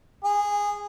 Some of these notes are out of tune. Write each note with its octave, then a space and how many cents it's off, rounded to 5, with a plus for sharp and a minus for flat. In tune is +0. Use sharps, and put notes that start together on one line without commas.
G#4 -15